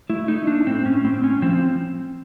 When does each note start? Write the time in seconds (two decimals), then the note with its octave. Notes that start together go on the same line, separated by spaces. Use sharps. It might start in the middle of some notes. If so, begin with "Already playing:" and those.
0.10 A3 E4
0.28 A3 D#4
0.47 A#3 D4
0.66 A2 C4
0.85 A2 C#4
1.04 A2 C4
1.23 A2 C#4
1.42 F3 C4